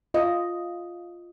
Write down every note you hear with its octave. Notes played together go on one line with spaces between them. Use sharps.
F4 D#5